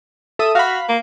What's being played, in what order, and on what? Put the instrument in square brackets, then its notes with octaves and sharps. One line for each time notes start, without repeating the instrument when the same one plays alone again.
[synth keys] A4 E5 D#6
[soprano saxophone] F#4 [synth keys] F5 B5
[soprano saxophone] A#3